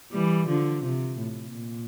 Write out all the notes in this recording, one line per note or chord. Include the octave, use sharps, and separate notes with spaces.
E3 G3
D3 F3
C3
A2
A#2